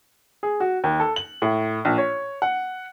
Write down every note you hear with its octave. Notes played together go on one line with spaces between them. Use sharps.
G#4
F#4
D#2
A4
F#7
A2
A#1
C#5
F#5